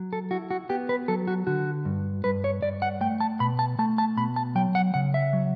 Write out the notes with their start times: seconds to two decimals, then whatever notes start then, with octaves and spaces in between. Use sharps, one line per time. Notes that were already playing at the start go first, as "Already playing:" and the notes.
Already playing: F#3
0.13 A4
0.31 E4 F#4
0.51 F#4
0.69 B3 G4
0.89 B4
1.08 F#3 A4
1.27 F#4
1.47 D3 F#4
1.85 G2
2.24 G2 B4
2.44 C#5
2.63 G2 D5
2.82 F#5
3.01 A3 G5
3.20 A5
3.40 B2 B5
3.59 A5
3.79 A3 A5
3.98 A5
4.17 B2 B5
4.36 A5
4.55 F#3 G5
4.75 F#5
4.94 C#3 F#5
5.14 E5
5.33 F#3